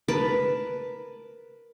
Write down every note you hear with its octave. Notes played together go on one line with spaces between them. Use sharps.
A#4 B4 A5